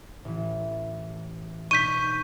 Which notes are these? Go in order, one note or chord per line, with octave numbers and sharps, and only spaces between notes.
A1 E3
B2 D4 D#4 C#6 G6 B6 D#7